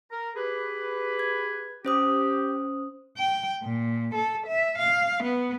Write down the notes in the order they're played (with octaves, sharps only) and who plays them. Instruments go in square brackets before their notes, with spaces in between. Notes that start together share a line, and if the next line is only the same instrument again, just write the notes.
[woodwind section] A#4 A#5
G4 G#4 B4
[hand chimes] G#6
[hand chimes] C#4 C5 D#6 [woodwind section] G4
[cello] G5
A#2
A4
E5
F5
B3